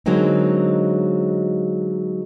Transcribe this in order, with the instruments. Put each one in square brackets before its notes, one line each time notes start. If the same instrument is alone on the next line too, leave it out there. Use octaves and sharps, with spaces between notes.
[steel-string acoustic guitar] D3 F#3 G#3 A#3 C4 D#4